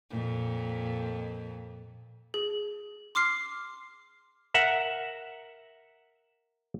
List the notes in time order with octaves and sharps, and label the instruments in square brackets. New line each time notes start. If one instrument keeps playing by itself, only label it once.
[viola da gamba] F2 A#2
[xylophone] G#4
C6 D6 F6 C7
[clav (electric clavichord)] A#4 E5 F#5